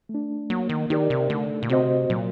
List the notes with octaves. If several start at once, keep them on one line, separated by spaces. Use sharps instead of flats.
A3
D4
F#3 A#3
D#3
D#3 D#4 G4 A#4 D5
C3
D3 A3
A#2
C3 C4 F#4 C5 D#5
A#2 F#3